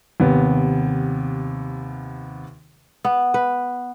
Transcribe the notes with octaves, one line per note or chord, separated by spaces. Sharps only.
D#2 C3 B3
B3
B4